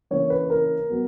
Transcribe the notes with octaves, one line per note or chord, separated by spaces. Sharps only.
C#3 E3 A#3 C#4 C#5
B4
A#4
F#3 B3